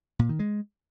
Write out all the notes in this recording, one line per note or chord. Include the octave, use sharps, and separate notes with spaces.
A#2
D#3
G#3